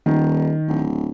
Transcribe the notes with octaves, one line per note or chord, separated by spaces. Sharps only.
D#1 D#3
D1